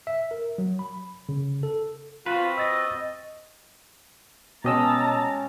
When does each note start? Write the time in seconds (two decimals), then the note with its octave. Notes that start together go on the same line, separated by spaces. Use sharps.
0.07 E5
0.31 A#4
0.58 F#3
0.79 B5
1.29 C#3
1.63 A4
2.26 C4 F4 F#4 B4
2.58 D#5 E6 A6 A#6
4.64 B2 G#3 C#4 G4 D#5 A5 A#5 E6